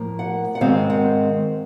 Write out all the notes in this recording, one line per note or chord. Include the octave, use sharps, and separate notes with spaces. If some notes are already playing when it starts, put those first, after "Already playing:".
Already playing: A2 F3 A#3
F#5
F#5
G#2 D#3 G#3 C4 F5
F#5